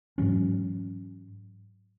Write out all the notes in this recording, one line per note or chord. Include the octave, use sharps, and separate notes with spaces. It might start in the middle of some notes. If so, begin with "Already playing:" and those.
G#2 E3 F#3 C#4